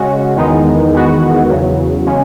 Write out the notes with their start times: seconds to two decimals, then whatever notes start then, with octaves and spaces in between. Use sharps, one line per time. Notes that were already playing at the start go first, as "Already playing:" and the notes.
Already playing: C#3 G#3 C#4 F#4
0.36 E2 D#3 G#3 B3 D#4
0.93 E2 D#3 G#3 B3 F#4
1.50 E2 C#3 F#3
2.07 C#3 G#3 C#4